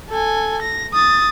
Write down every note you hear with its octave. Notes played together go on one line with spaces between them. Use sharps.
A4 G#5
A#6
D#6 A6